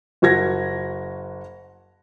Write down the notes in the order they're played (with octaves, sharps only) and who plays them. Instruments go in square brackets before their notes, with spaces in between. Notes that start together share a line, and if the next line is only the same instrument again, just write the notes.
[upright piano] F#1 F#4 A#4 G#6 A#6